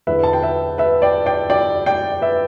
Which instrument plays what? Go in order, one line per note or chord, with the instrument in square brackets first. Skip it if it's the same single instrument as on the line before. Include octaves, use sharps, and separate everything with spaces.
[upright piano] E2 D3 B4 E5
A5
G5
B4 E5
B4 E5
D5 G5
D5 G5
D5 G5
D5 G5
B4 E5